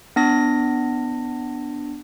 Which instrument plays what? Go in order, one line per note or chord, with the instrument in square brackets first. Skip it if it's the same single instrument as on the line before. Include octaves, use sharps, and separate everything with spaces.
[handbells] B3 D4 A#6